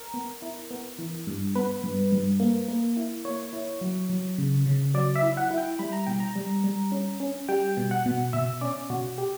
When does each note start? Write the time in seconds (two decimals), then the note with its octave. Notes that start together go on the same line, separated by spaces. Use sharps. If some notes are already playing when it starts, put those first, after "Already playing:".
Already playing: A#4
0.14 B3
0.42 E4
0.71 B3
0.99 E3
1.27 G2
1.55 B3 B4
1.83 G2
2.12 G2
2.40 A#3
2.68 A#3
2.97 E4
3.25 A#3 C#5
3.53 E4
3.81 F#3
4.09 F#3
4.38 C#3
4.66 C#3
4.94 F#3 D5
5.16 E5
5.22 E4
5.37 F#5
5.51 E4
5.58 G5
5.79 G3 B5
5.93 A#5
6.07 B2 G5
6.20 A#5
6.35 G3
6.64 G3
6.92 C#4
7.20 C#4
7.49 G3 G5
7.77 B2
7.91 F#5
8.06 B2
8.33 B2 E5
8.61 C#4 D5
8.90 B2 F#4
9.18 G4